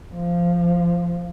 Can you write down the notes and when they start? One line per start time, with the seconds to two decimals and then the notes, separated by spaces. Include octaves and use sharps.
0.14 F3